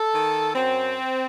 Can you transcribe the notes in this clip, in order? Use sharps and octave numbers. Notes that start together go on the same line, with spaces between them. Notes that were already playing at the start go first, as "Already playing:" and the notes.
Already playing: A4
D#3
F#2 C4